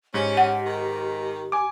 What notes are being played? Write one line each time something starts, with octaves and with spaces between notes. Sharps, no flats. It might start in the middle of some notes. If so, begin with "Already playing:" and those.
G#2 C#4 G4
F#5
D#3
G#5 D6